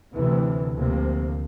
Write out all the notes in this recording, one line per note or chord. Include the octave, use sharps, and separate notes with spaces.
D2 C3 E3
D2 C3 F3 A#3